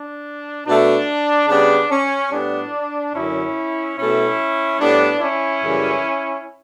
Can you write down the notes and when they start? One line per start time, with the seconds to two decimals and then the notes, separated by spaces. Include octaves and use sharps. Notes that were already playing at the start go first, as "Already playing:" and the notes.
Already playing: D4
0.66 B2 A3 D4
1.48 C#3 G3 B3 D4
1.91 C#4
2.31 A2 G3 B3 D4
3.14 F#2 D3 F#3 C#4 E4
3.97 B2 A3 C#4 E4
4.79 A2 G3 B3 D4
5.21 C#4 E4
5.62 F#2 C#3 E3 G3